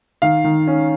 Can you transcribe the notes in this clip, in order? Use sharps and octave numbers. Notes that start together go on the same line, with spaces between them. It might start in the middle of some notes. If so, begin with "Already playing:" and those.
D#3 F5
D#3
C#4